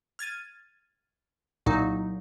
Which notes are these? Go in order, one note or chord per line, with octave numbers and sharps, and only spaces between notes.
F6 G#6 A6 D#7
C2 A#2 F#3 D#4